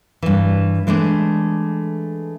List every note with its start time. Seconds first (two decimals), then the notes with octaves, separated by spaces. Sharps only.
0.22 G2 E3
0.87 E3 G#3 A3 D4